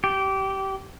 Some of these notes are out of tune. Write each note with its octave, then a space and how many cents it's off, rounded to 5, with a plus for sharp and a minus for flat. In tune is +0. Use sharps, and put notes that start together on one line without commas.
G4 -20